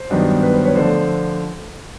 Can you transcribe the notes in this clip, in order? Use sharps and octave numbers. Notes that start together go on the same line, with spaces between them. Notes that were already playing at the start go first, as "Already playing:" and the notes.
Already playing: C5
G2 D#3 F#3 B3 D4
B4
C5
B4 C#5
D3 F3 A3 C5 D5